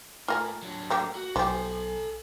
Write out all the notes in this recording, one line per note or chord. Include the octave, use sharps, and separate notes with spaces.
A2 F4 A#4 G#5
F#3 D4
A3 A#3 G4
F#4
B1 F3 G4 A4 G#5